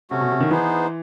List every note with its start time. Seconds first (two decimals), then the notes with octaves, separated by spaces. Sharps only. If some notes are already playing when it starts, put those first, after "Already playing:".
0.10 C3 A3 C#4 F#4
0.21 B2
0.30 C3
0.40 D#3
0.50 E3 B3 D#4 G#4 C5